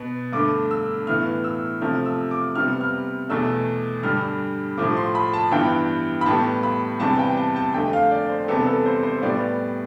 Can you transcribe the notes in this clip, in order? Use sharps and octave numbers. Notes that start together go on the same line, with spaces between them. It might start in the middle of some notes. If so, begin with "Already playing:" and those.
Already playing: B2 B3
G2 D3 A3 D6
E6
A2 E3 B3 F6
E6
C3 F3 A3 F6
E6
D6
C3 G3 B3 F6
F6
E2 B2 A3 E6
G2 D3 G3 F6
A2 F3 A3 D6
C6
B5
A5
G2 E3 G3 B3 G5
B5
A2 G3 B3 A5
B5
E2 C3 G3 B3 A5
G5
A5
A5
F2 D3 A3 G5
F5
D5
C5
E2 C3 G3 B3 A4
A4
C5
C5
A2 G3 B3 D5